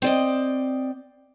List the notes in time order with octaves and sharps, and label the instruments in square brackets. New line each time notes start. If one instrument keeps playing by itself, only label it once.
[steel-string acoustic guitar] C4 D5 D#5